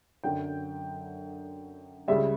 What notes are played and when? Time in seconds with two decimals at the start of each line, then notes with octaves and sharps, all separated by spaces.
0.24 F#2 D3 F#3 G5
2.08 C#2 C#3 G3 E5